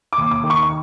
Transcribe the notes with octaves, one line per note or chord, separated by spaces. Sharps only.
D6
D#2
D6
D#3
C#6